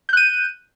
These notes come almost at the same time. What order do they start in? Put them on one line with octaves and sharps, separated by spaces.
G6 F#6 D#7